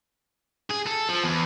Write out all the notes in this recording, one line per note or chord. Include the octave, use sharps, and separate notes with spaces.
G#4
A4
F3
E2